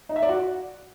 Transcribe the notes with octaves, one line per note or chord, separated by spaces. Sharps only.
D#4
E5
D5
F#4